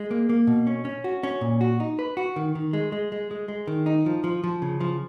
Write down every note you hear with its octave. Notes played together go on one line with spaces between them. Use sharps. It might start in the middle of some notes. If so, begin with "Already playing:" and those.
Already playing: G#3
A#3
A#3
B2
C#4
C#4
F#4
C#4
A#2
F#4
D#4
B4
F#4
D#3
D#3
G#3
G#3
G#3
G#3
G#3
D#3
D#4
F3
F3
F3
C#3
F3